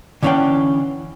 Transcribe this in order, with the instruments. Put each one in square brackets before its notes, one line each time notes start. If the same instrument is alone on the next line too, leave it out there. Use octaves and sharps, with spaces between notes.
[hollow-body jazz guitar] D3 E3 C#4 D4 F5 G5